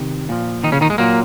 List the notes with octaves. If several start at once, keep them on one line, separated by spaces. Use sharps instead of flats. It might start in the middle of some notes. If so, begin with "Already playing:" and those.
Already playing: C3 D#3
A#2 F3
D#3 D#4
C#3 C#4
D#3 D#4
G#3
A#2 F#3 A#3